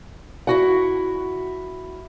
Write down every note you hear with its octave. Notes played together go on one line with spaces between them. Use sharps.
E4 F#4 F#5